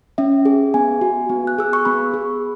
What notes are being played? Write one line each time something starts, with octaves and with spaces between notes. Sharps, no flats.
C#4 E5
G#4
B3 G#5
F#4
B3
F#6
G#4 E6
C#6
B3 B5
G#4